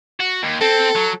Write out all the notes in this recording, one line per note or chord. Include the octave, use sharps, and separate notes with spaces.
F#4
D#2
C4 A4
F#3